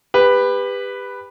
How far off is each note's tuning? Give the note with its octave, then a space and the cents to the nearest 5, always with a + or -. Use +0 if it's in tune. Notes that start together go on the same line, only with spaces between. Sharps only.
G4 +30 B4 +5